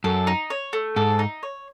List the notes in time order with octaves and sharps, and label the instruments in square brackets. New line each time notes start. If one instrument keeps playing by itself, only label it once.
[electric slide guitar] F#2 [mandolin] A4
[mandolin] D#4
C#5
A3
[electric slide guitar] G#2 [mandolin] A4
[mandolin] D#4
C#5